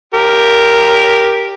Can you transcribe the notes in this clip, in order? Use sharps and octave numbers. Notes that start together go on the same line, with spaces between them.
G4 A#4